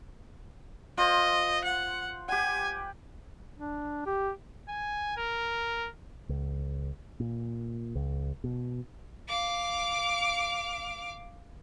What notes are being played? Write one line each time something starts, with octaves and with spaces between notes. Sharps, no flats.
F4 C5 D#5
F#5
G4 F#5 G#5
D4
G4
G#5
A#4
C#2
A#2
C#2
B2
F5 D6